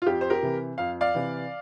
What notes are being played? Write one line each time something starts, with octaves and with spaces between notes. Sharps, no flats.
F4
F2 G4
C5
G4 A#4
C3 E3
F2 F5
D5 F5
C3 E3